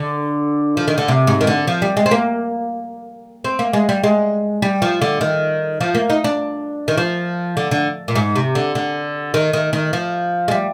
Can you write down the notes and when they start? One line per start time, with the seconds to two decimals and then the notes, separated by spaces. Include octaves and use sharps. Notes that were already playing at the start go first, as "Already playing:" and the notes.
Already playing: D3
0.77 F3
0.88 D#3
0.98 D3
1.08 C3
1.27 G#2
1.41 D#3
1.47 D3
1.67 F3
1.82 G3
1.97 G#3
2.06 C4
2.11 A#3
3.44 C4
3.59 A#3
3.73 G#3
3.89 G3
4.04 G#3
4.62 G3
4.82 F3
5.01 D3
5.21 D#3
5.81 F3
5.95 A#3
6.10 D#4
6.24 D4
6.88 D#3
6.97 F3
7.57 D3
7.71 D3
8.08 A#2
8.15 G#2
8.35 C3
8.55 D3
8.75 D3
9.34 D#3
9.53 D#3
9.73 D#3
9.93 F3
10.48 G#3
10.51 G3